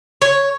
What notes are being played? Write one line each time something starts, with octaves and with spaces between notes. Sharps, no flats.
C#5